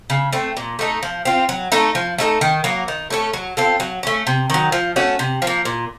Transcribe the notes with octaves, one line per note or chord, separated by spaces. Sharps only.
C#3
A3 C4
A#2
A3 D#4 A4
F3
C4 F4
F#3
A3 D#4 A4
F3
A3 D#4 A4
D#3
F#3 A#3
D#3
A3 C#4 A4
F#3
C4 F4 A4
F#3
A3 C#4
C3
D#3 F#3
F3
A3 C#4 F#4
C3
F3
A#3
A#2